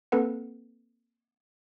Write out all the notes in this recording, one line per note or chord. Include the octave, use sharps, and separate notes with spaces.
A#3 C4 A4 B4 F#5